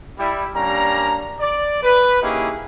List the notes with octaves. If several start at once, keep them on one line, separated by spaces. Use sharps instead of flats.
G3 E4
G3 A#3 C#4 D4 A#5
D5
B4
A#3 C#4 D#4 E4 G4 G#4